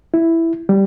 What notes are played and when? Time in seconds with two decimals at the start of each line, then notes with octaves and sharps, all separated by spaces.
0.14 E4
0.69 G3